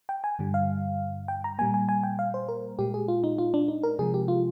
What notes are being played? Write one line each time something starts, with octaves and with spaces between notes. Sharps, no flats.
G5
G#5
G2 D3 G3
F5
G5
A#5
A#2 G3 A#3 G#5
G#5
G#5
G5
F5
C5
A#4
A#2 G#3 G4
G#4
F4
D#4
F4
D4
D#4
A#4
C3 F3 G#3 G#4
G4
F4